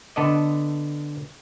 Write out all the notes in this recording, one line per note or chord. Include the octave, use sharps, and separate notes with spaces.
D3 B3 A4 D5 D#5